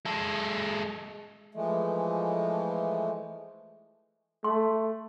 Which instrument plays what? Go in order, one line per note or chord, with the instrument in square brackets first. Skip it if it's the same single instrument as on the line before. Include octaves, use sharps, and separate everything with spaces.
[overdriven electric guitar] G#3 A4
[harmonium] E3 F3 G#3 A3
[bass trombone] A3 [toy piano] C6